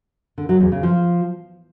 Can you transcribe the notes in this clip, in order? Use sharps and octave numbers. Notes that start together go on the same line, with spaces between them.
D3
F#3
E2
C#3
F3